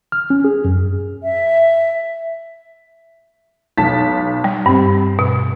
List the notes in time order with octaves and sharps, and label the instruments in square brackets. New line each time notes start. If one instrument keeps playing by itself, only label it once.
[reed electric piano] F6
C#4
G#4
F#2
[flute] E5
[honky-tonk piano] B1 A5 B6
[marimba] G3
[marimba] G2 [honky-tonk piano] C4
[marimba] B2